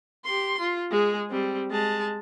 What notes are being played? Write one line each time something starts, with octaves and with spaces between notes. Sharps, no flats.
G4 C6
F4
G#3 G#4
G3 C4
G#3 A5